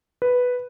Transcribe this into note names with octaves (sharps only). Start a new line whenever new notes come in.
B4